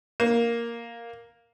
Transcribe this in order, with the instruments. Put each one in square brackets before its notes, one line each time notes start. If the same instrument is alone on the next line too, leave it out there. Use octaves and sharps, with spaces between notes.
[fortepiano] A#3